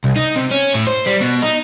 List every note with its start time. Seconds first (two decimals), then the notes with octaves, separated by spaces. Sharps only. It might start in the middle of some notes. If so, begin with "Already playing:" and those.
0.04 C2
0.16 D#4
0.36 C3
0.51 C#4
0.74 A2
0.87 C5
1.07 G3
1.21 B2
1.42 D#4